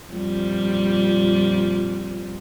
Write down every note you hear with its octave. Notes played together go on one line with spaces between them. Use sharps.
F2 A#2 G3